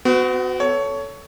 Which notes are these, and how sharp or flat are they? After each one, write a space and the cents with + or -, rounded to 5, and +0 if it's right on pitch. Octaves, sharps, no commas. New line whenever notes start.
B3 +45 F#4 +0
A4 +0 C#5 +15